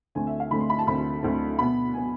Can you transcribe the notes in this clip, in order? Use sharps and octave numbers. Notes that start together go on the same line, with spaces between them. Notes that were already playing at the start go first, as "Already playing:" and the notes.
D2 D3 A3 C4 G#5
E5
F5
D2 D3 A3 C4 B5
C6
B5
A5
D2 D3 A3 C4 B5
D2 D3 A3 C4
B2 B3 B5
B2 B3 G#5